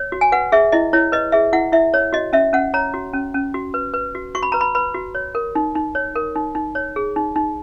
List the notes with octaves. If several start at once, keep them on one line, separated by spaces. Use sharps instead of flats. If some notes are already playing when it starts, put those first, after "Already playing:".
Already playing: C#5
F#4
G#5
B4 F#5
G#4 E5
E4 D#5
E4 C#5
B4 D#5
G#4 E5
E4 F#5
E4 E5
C#5
F#4 D#5
C#4 E5
C#4 F#5
C#5 A#5
F#4
C#4
C#4
F#4
B4
B4
F#4
F#4 C#6
B5
B4 A#5
B5
B4 B5
F#4
C#5
A#4
D#4
D#4
C#5
A#4
D#4
D#4
C#5
G#4
D#4
D#4